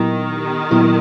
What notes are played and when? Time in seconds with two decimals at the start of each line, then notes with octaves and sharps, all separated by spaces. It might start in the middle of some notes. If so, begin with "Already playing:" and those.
Already playing: A#2 D#3 F#3 B3 E4 G4
0.71 A#2 F#3 B3 E4 G4